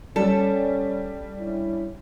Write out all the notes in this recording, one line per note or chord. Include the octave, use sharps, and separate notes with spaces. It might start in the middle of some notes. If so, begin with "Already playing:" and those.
G3 C#4 A4
C#4 D4 E4